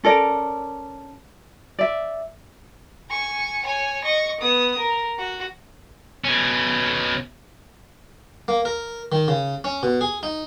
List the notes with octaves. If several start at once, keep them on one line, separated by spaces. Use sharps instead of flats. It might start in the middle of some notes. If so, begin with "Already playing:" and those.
C#4 A4 A#4 D5
D5 E5
G#5 C#6
C#5 G#5
D#5 C#6
B3 D#6
A#4
F#4
B2 C#4
A#3
A#4
D#3
C#3
C#4
B2
G#4
D#4